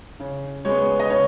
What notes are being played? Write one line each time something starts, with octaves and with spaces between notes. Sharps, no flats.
C#3
G#3 B3 C#5
D#5
C#3 C#5